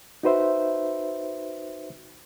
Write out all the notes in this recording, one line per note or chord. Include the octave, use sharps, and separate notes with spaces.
D#4 F#4 B4 C5 E5